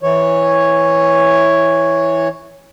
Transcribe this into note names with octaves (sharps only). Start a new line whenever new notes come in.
E3 C#5